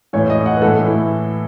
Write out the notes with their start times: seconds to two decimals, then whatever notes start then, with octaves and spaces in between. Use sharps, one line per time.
0.13 A2 E3 C#5
0.30 D#5
0.46 F#5
0.57 B4
0.62 A2 E3 A4
0.86 E4